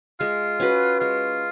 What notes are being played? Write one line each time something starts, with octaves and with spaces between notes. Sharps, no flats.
G#3 F4
C#4 F#4 B4
G#3 F4